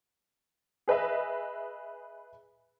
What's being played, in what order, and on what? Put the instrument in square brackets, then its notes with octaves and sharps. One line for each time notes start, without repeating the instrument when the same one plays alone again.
[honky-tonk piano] G#4 B4 D#5 E5